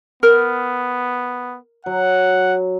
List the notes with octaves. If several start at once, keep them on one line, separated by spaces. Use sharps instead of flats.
B3 A#4
F#3 F#5